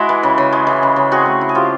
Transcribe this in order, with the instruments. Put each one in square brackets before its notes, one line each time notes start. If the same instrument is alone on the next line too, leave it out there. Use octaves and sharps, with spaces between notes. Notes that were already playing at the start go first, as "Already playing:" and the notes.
Already playing: [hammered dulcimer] G#3 E4 F#4
E3
C#3
C#3
G#3
E3
C#3
C#3
C4 F#4 G#4
A3
E4
G#4
F3 F4 G4